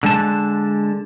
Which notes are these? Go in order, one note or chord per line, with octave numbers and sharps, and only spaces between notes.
D3 G#3 A5